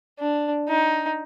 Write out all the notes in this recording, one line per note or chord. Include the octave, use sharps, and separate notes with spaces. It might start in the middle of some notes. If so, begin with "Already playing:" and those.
D4
D#4